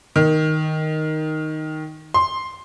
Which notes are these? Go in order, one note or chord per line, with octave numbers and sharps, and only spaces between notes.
D#3
C6